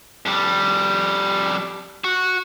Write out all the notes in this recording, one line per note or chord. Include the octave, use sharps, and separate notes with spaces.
F2 G3
F#4